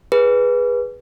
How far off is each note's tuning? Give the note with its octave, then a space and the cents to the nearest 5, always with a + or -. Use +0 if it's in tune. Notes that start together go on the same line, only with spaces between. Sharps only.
G#4 -15 B4 -15